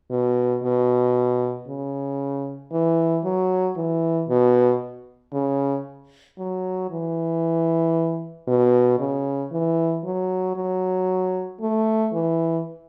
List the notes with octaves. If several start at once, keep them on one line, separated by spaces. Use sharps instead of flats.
B2
B2
C#3
E3
F#3
E3
B2
C#3
F#3
E3
B2
C#3
E3
F#3
F#3
A3
E3